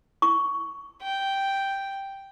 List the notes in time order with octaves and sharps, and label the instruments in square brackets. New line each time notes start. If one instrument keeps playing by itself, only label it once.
[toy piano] C#6
[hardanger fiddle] G5